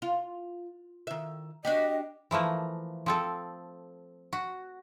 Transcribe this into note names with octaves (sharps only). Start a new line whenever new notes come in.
F4
D#3 E5
D4 F#4 G4 D#5
E3 F3 A3 A#3
F3 C4 A4
F#4